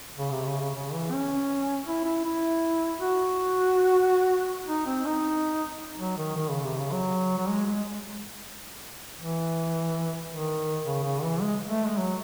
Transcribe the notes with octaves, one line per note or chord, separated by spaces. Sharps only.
C#3
C3
C#3
C#3
C#3
E3
C#4
E4
E4
E4
F#4
D#4
C4
D#4
F#3
D#3
D#3
C#3
C3
C#3
F#3
F#3
G#3
G#3
E3
D#3
C#3
C#3
E3
G#3
A3
G#3
F#3